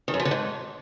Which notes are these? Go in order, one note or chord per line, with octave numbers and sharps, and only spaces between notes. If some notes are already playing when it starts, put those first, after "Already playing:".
D#3
F#2
F3
D3
G#2